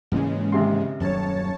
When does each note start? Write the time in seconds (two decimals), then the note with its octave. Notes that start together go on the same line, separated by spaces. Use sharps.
0.12 G#2 C#3 E3 G#3 A#3
0.52 G#1 C3 C6
1.00 D#1 F#2 D#3 C#5 A5